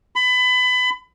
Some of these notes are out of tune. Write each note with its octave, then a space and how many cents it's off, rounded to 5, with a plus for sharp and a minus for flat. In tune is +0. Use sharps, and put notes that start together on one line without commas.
B5 +25